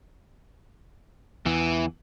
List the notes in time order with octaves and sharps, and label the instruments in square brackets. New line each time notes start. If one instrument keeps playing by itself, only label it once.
[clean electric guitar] E2 [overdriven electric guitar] E3